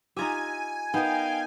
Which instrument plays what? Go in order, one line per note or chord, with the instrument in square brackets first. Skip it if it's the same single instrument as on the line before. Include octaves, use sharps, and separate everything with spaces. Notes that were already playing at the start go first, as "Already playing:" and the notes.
[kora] D#4 F4 G4 [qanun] E5 A#5 [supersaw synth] G#5
[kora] B3 B4 [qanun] D#4 A#4 [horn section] F5 G5